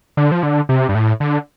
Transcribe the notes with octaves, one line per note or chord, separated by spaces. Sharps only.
D3
F3
D3
C3
G2
A2
D3